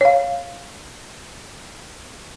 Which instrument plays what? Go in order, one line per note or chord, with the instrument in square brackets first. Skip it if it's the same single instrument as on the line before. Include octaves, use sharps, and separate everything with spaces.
[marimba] C#5 F5